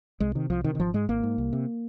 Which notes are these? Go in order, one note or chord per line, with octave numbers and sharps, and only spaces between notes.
C2 G#3
C3 D#3
C2 F3
C3 D#3
D#3
G#1 F3
G#2 G#3
G#1 A#3
G#2
C2
C3